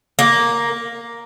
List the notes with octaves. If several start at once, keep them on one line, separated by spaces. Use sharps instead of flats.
A#3